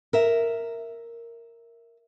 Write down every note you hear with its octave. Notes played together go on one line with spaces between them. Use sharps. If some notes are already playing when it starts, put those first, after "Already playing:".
A#4 E5